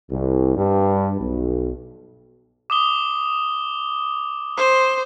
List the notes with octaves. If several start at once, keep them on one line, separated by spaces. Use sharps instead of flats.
C2
G2
B1
D6 D#6 G7
C5